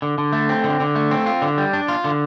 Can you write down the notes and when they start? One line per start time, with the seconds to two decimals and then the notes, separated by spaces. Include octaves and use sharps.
0.02 D3
0.18 D3
0.33 A3
0.49 C4
0.64 D3
0.80 D3
0.95 A3
1.11 C4
1.26 F4
1.42 D3
1.58 G3
1.73 D4
1.88 F4
2.04 D3